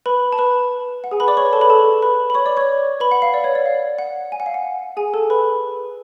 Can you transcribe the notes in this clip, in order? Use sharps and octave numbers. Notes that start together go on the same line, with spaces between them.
B4 B5
A5
B4 B5
F#5
G#4 G#5
B4 B5
D5 D6
C#5 C#6
B4 B5
A4 A5
B4 B5
A4 A5
B4 B5
B5
C#5 C#6
D5 D6
C#5 C#6
B4 B5
F#5
F5
D5
C#5
D5
F5
F#5
G#5
F#5
F5
F#5
G#4 G#5
A4 A5
B4 B5